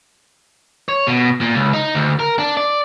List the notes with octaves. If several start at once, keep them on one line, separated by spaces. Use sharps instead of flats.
C#5
B2
A#2
C#2
D#4
D2
A#4
D4
D5